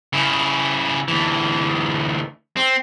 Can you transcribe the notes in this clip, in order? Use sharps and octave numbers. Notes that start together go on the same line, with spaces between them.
C#3 E4
D2 E3
C4